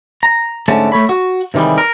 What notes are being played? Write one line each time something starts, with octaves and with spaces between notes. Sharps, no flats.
A#5
G#2 D3 A3 C#4 A5
A3 C#5 B5
F#4
C3 D#3 E3 G3 G#3
A#4